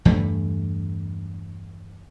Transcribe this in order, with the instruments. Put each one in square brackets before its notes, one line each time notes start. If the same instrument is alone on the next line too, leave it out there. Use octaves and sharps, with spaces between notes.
[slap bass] E2 G2 A3